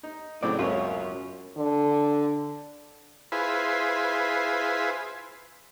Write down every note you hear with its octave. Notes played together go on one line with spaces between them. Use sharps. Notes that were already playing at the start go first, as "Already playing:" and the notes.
D#4
A2 C#3 F#3 C4 D5
C#2 F#2 B2 F4 C#5
D3
E4 F4 G#4 B4 C5